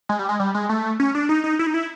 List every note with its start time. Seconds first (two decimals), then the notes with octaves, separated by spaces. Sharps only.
0.09 G#3
0.19 G3
0.29 G#3
0.40 G3
0.55 G#3
0.69 A3
1.00 C#4
1.15 D4
1.29 D#4
1.44 D#4
1.59 E4
1.67 D#4
1.74 E4